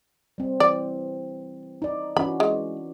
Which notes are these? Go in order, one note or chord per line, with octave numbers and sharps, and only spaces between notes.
G3 C4
E3 D5
D#4 D5
E3 C#4 F#4 B5
G#3